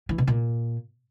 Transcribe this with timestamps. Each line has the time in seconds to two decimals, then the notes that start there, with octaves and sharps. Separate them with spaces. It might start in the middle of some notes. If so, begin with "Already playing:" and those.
0.09 E3
0.18 B2
0.27 A#2